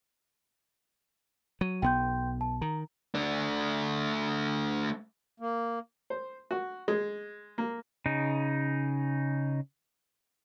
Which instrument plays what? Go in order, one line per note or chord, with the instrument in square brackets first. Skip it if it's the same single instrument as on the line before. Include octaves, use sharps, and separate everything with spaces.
[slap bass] F#3 [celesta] D#7
[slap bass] B1 B3 [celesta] G5 C6 G6
[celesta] A5
[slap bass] D#3 [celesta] A#5
[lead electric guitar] A3 D4
[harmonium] A#3
[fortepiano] C5
F#4
G#3
A#3
[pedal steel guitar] C#3 D#4